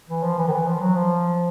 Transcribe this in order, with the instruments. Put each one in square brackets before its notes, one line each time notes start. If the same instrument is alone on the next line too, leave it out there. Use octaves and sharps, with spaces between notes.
[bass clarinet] E3
F3
E3
D#3
E3
F3
F#3
F3